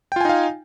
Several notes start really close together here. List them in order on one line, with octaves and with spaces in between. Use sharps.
G5 F4 G#5 D#4 F5